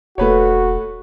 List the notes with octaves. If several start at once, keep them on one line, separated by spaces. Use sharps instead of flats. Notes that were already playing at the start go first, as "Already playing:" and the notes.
E1 A3 F#4 B4 C#5